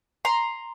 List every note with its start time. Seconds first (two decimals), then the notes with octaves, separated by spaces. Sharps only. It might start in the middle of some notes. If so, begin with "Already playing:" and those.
0.25 A#5 C6